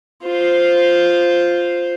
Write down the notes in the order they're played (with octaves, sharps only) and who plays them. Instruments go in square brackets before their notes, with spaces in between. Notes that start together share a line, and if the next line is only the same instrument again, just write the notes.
[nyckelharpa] F4 C5